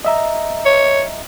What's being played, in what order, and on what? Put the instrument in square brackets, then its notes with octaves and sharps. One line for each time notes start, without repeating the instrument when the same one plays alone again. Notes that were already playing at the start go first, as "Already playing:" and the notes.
[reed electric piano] D#5 E5 A#5
[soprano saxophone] C#5